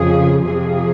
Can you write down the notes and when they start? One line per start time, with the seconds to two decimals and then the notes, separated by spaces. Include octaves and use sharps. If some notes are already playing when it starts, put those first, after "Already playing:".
Already playing: F2 C#3 F3 G#4
0.44 F2 C3 F3 G#4